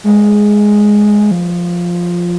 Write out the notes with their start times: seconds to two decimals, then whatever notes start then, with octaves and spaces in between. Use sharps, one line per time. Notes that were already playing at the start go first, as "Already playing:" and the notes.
0.04 G#3
1.31 F3